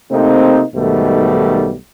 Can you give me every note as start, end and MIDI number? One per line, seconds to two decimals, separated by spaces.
0.11 0.63 48
0.11 0.63 57
0.11 0.63 58
0.11 0.63 60
0.11 0.63 63
0.75 1.75 35
0.75 1.75 44
0.75 1.75 47
0.75 1.75 51
0.75 1.75 55
0.75 1.75 57